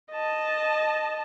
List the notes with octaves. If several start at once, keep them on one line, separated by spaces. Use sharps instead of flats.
D#5 A5